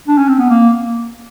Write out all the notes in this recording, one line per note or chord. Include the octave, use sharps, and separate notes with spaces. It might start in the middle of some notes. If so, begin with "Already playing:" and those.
D4
C#4
C4
B3
A#3